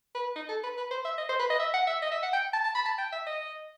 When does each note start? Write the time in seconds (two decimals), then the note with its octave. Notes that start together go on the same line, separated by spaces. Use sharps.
0.15 B4
0.36 D#4
0.49 A4
0.64 B4
0.77 B4
0.91 C5
1.05 E5
1.18 D#5
1.29 C5
1.39 B4
1.50 D#5
1.60 E5
1.74 F#5
1.87 E5
2.02 D#5
2.11 E5
2.23 F#5
2.33 G5
2.53 A5
2.64 A5
2.75 B5
2.85 A5
2.98 G5
3.12 E5
3.27 D#5